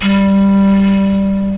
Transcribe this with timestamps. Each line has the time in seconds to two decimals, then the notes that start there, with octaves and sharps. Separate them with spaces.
0.02 G3